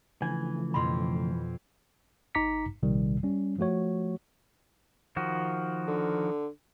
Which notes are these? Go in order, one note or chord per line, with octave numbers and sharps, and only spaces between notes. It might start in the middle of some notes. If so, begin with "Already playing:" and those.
C#3 E3 F3 A3 D4 G#6
F2 B2 B5 C6
A1 D#4 A#5 D6 B6 C#7
A#1 C3 D#3 G3
G3 C#4
F3 A3 F#4 C#5
D#3 F3 F#4
D3